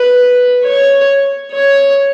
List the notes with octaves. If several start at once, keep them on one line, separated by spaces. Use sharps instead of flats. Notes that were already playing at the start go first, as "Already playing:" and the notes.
Already playing: B4
C#5
C#5